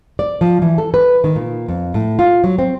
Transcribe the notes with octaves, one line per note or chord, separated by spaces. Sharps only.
D5
F3
E3
A4
B4
D#3
A#2
F2
A2
F4
F#3
C4